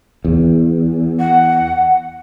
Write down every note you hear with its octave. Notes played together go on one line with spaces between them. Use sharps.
E2
F#5